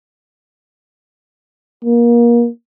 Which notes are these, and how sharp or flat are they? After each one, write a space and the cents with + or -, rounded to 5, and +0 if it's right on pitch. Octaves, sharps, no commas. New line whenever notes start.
A#3 +25